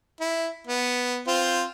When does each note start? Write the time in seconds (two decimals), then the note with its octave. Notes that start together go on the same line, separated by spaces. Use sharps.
0.21 E4
0.67 B3
1.27 C4 F4 C5